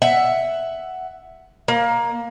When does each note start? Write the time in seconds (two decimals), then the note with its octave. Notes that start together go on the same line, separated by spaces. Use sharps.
0.02 E5 F#5
1.68 A#3